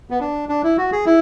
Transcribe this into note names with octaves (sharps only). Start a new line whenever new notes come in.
B3
D4
D4
E4
F#4
G#4
E4